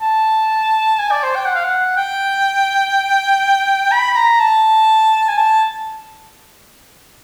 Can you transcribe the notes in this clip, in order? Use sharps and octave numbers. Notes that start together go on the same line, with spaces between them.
A5
G#5
D5
C5
G5
F#5
F5
F#5
G5
B5
A#5
A5
G#5
A5